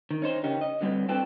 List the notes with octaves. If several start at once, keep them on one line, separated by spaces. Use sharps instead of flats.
D#3
C#4 D#4 C5
C#3 C#4 D#4 G4 A#4
D#5
D3 F#3 G3 C4 B4
C4 D4 F4 A4 B4 G5